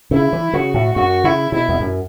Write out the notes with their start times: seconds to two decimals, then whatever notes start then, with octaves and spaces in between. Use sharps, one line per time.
0.11 C#3 E4
0.33 E3
0.53 C#3 F#4
0.74 A2
0.95 F#2 F#4
1.24 C#3 E4
1.52 B2 E4
1.69 E2
1.80 F#2